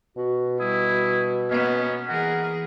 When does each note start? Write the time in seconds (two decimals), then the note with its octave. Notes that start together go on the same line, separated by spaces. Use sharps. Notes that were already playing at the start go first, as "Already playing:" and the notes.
0.17 B2 F#4
0.60 G3 E4 D#6
1.50 A#3 B3 C#4 D#5
2.08 E3 G#4 A#4 F#5